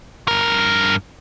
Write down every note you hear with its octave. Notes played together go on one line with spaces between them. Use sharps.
G2 A#4